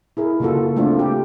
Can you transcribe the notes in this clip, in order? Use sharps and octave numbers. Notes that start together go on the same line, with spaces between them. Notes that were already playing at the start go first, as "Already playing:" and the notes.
E4 G#4 A#4
C#3 A#3 F4 F#4 A4
A3 B3 C4 D4 F4
G4